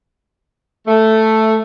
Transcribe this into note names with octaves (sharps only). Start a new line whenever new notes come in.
A3